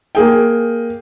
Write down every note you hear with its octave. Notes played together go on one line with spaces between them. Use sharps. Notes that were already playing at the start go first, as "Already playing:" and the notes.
A#3 G#4 G5